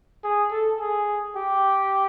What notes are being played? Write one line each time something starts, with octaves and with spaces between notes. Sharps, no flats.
G#4
A4
G#4
G4